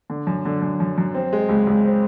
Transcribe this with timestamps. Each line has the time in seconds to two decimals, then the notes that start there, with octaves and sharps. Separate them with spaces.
0.10 D3
0.27 F#2
0.45 D3
0.62 F#2
0.80 F#2
0.98 F#2
1.14 C4
1.33 G#3
1.49 C#2
1.67 C#2
1.85 C4